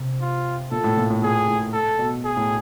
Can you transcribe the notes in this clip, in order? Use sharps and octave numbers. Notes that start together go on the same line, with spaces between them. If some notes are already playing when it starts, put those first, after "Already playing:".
Already playing: C3
F4
A#2 A4
A2
A#2
A2
A#2 G#4
A2
A4
B2
G#4
A2